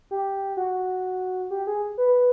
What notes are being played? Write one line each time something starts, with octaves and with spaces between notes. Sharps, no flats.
G4
F#4
G4
G#4
B4